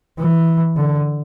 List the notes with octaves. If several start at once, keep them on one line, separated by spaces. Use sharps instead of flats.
E3
D3